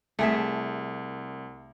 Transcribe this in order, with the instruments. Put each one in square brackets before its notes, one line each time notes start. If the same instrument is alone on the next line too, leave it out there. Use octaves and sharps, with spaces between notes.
[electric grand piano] C2 [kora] A3 G#4 E5